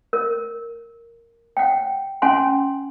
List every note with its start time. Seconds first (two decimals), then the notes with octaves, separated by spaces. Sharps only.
0.13 A#4
1.57 F#5 G5
2.22 C#4 F#5 G#5 C6